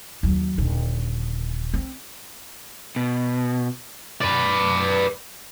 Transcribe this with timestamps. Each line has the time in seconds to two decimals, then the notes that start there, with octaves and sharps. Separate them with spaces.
0.23 D#2 F#3
0.58 D#1 D3
1.74 C4
2.96 B2
4.22 B4 D5